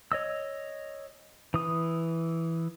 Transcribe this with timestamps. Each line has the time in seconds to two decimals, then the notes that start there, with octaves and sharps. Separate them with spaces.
0.12 C#5 D#5 E6
1.54 E3 D#6